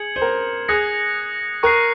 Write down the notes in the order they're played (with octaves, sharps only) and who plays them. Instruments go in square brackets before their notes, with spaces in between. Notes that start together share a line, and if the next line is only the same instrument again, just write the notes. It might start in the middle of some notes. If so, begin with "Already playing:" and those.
Already playing: [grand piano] G#4 [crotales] G#6 C#7 F#7
[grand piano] C5
A#4
[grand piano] G#4 [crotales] D#6 F#6 A#6 C#7
[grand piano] A#4 [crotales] C#6 F#6 C7